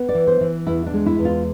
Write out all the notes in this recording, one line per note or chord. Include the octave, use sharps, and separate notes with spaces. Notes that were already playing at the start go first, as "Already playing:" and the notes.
Already playing: B3
D5
E3
C5
E3
E2 E4
D4
G#3
E4
E2
F4